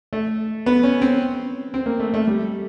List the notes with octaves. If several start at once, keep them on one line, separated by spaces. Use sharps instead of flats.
A3
B3
C#4
C4
C4
A#3
A3
A3
G3